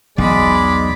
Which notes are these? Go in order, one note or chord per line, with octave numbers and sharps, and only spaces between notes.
B1 E2 G#3 D5 B5